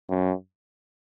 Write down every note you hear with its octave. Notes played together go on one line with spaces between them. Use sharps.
F#2